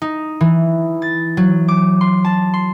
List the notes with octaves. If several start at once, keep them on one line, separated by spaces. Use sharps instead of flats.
D#4
E3
A6
F#3
D6
C6
A5
C6